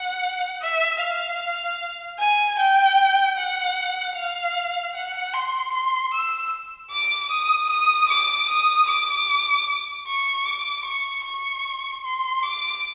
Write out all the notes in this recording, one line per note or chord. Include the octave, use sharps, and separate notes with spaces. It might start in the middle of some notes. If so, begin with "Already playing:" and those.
Already playing: F#5
E5
F5
G#5
G5
F#5
F5
F#5
C6
C6
E6
D6
D#6
D#6
D6
D#6
D6
C#6
D6
C#6
C#6
C6
D6